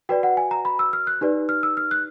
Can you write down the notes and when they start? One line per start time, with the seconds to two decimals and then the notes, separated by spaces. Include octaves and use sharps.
0.09 F#4 B4 D5 G5
0.23 F#5
0.37 G#5
0.51 A#5
0.65 B5
0.79 E6
0.93 F6
1.07 F#6
1.21 D#4 G4 B4 D5
1.49 F6
1.63 E6
1.77 F6
1.91 F#6